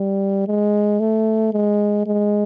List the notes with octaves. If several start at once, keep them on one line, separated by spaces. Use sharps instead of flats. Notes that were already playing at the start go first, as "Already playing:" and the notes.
Already playing: G3
G#3
A3
G#3
G#3